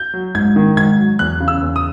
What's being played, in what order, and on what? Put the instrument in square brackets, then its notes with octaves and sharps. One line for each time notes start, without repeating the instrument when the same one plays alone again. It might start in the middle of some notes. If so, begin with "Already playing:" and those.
Already playing: [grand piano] G6
F#3
G#2 G#6
D#3
G#2 G#6
F#3
E2 F#6
C#3
E6
E2
D#6